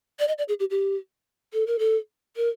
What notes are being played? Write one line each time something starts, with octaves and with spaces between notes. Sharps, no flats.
D5
D#5
D5
G#4
G4
G4
A4
A#4
A4
A#4